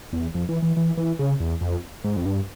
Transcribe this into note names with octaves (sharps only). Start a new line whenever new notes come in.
E2
F2
E3
E3
E3
E3
C#3
E2
F2
G#2
F2
G2